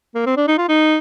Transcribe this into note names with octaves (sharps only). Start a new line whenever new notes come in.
A#3
C4
D4
D#4
F4
D#4